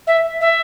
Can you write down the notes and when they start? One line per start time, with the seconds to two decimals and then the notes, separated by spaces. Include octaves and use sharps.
0.07 E5
0.40 E5